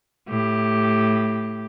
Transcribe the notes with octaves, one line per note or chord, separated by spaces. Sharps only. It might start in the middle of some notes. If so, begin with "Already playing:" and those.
A2 G4